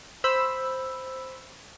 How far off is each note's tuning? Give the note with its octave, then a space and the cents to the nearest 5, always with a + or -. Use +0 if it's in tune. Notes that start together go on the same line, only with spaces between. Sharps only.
C5 +0 B5 +0 E6 +0